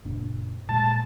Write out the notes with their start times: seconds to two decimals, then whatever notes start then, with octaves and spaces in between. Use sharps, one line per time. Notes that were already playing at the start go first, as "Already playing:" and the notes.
0.05 F#1 A#2 D4
0.69 A#2 G#3 A#3 A5